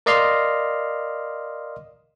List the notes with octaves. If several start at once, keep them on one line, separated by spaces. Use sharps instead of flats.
A#4 D5 D#5 F5 C6 F6